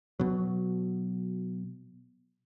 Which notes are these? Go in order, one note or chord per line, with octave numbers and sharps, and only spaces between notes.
B2 F#3